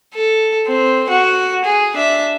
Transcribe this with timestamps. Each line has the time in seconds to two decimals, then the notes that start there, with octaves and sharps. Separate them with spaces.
0.14 A4
0.67 C4
1.09 F#4
1.65 G#4
1.96 D4 E5